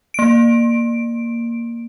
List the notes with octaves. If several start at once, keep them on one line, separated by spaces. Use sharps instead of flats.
A#3 D7